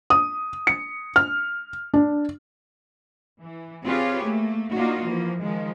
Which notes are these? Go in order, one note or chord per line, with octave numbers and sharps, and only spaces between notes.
D#6
C#7
F6
D4
E3
C4 F4 G4 G#4 B4 C#5
A3 A#3
A#3 D4 D#4 F4 F#4
E3 F3 A#3
D#3 F3 G#3